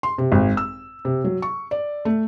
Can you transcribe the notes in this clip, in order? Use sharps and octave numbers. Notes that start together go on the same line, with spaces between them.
C6
C3
G#1
E6
C3
F#3
C#6
D5
A3